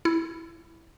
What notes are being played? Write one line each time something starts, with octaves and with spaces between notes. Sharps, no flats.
E4